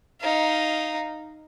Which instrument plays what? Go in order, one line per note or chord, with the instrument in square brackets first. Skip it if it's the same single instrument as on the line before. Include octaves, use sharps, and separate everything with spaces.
[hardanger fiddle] D#4 F5